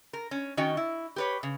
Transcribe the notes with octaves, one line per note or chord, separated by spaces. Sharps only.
A#4
C#4
D#3 C#4 F#4 D#5 G5
E4
G4 B4 C#5
C#3